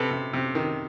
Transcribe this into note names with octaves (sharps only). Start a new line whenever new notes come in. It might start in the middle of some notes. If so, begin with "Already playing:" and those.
Already playing: C3 A4 B4
C3
C3
D#3